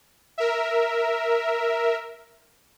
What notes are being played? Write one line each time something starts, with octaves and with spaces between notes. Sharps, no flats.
A#4 E5